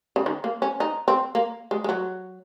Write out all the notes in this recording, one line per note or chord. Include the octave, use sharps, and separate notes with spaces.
C#3
D#3
A#3
C#4
D#4
C4
A#3
G#3
G#3
F#3